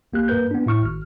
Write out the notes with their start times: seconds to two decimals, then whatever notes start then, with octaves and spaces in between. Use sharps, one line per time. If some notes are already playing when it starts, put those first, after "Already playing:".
0.13 B1 A#3 G4 F#6
0.28 G2 A#3 A#4 B4 G6
0.51 B3 D4
0.66 A2 E4 C#6 F6
0.83 G#1 F6